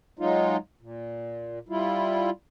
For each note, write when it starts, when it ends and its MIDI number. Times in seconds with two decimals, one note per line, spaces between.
0.19 0.57 54
0.19 0.57 56
0.19 0.57 63
0.19 0.57 65
0.81 1.59 46
1.69 2.30 55
1.69 2.30 64
1.69 2.30 65